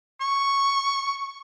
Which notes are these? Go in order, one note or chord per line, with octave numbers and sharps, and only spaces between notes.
C#6